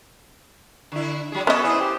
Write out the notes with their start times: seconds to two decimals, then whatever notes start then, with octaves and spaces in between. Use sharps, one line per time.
0.92 D3 E4
1.32 F#3 G#3 G#4
1.47 B3 C#4 A4 B4 D#5
1.64 E4 G#4 B4 C5
1.80 G4